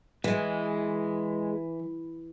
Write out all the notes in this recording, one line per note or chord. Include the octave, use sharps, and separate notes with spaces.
E3 G#3